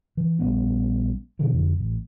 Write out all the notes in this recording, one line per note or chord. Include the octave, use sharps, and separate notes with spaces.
E3
A#1 G3 B3 C#4
B2 D3 E3
F1 F2 D3
A1